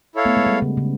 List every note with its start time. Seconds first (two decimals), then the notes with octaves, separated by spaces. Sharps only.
0.15 E4 A4 C#5 F5
0.26 A3 B3
0.37 G#3
0.46 G3
0.62 C#3
0.77 C#3